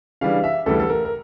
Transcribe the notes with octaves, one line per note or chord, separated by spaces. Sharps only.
C#3 E3 G3 D4 F5
E5
D2 C#3 E3 G3 A4
A4
A#4
A#4